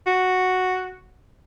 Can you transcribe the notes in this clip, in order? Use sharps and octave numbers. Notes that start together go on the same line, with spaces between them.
F#4